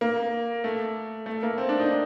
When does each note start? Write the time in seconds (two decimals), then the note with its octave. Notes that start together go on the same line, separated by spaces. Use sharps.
0.01 A#3
0.64 A3
1.26 A3
1.43 A#3
1.58 C4
1.69 D4
1.79 D#4